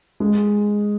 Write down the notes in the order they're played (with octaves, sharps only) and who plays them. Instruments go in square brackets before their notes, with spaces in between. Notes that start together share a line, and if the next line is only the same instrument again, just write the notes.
[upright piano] G#3